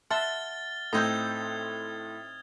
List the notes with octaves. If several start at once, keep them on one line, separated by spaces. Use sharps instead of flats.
E5 F#5 A5 C6 F6 A6 G7
A2 C4 D#4 D#6 G6 G#6